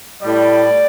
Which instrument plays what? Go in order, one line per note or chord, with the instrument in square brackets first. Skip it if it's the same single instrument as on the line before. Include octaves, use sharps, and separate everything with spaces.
[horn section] A2 G3 D5